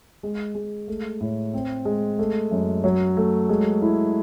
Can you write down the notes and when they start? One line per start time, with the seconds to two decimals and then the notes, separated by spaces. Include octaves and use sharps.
0.23 G#3
0.55 G#3
0.88 A3
1.21 A2
1.54 C4
1.85 G#3
2.19 A3
2.51 F#2
2.84 F#3
3.17 A3
3.49 G#3
3.82 E4